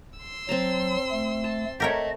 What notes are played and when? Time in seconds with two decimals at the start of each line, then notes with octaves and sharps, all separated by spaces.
0.19 C6 E6
0.49 F#3 C4 A5 A#5
1.11 A3
1.44 A5
1.80 A3 G4 A#4 C#5 D#5